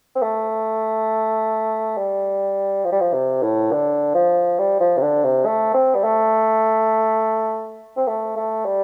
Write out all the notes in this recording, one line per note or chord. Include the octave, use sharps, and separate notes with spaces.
C4
A3
G3
F3
G3
F3
C3
A2
D3
F3
G3
F3
C3
D3
C3
A3
C4
G3
A3
C4
A3
A3
G3